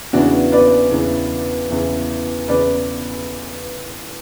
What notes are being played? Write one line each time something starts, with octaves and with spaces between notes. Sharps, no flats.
E2 C#3 E3 D4 F#4
B4 D5
E2 C#3 E3
E2 C#3 E3
E2 C#3 E3 B4 D5